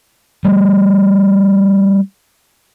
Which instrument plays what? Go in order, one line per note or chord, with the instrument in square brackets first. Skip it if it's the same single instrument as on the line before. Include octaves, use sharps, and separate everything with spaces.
[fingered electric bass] G3 A3